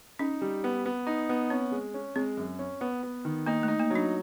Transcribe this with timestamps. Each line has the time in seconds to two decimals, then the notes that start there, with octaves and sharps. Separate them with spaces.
0.19 C#4 D#4
0.41 G3
0.64 B3
0.86 B3
1.07 D#4
1.29 B3
1.50 C4 C#4
1.72 G#3
1.94 C#4
2.16 G#3 C4
2.37 F#2
2.59 C#4
2.81 B3
3.03 B3
3.25 D#3
3.46 A#3 D#4
3.63 A3 D#4
3.79 A#3
3.90 F#3 D4